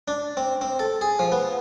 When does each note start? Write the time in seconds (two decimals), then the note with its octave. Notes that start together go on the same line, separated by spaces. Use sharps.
0.08 D4
0.37 C4
0.61 C4
0.79 A4
1.01 G#4
1.19 F3
1.32 B3